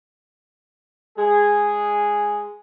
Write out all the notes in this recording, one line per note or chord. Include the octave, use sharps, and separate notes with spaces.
G#3 G#4